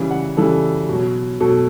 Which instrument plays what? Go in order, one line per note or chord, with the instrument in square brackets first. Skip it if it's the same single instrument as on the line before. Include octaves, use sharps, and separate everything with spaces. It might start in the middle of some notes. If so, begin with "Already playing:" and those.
Already playing: [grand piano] C#3 E3 G3
F#5
C#3 E3 G3 A4
B2 F#3
B2 F#3 A4